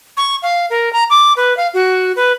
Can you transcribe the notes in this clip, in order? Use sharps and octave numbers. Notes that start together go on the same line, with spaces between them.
C#6
F5
A#4
A#5
D6
B4
F5
F#4
B4